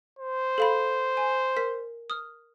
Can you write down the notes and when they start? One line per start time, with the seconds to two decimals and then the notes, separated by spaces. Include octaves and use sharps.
0.19 C5
0.58 A4 F5 B5
1.17 G#5
1.57 A#4 B6
2.10 D#6 F6